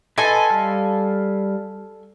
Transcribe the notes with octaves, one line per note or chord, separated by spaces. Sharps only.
A4 B4 D#5 G#5 C6
G3 F5